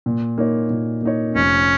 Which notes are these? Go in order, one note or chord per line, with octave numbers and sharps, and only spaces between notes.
A#2
A#3 D#4 C#5
A#2
A#3 D#4 C#5
F1 C#4